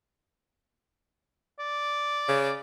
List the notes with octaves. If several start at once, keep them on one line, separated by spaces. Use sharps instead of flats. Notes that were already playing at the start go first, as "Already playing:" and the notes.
D5
C#3